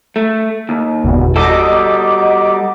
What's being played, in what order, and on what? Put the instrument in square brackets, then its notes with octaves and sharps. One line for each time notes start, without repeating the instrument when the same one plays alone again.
[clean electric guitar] A3
D#2
[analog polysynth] G1 E2 B2
[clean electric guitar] G3 F#4 A4 [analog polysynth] D#5 D6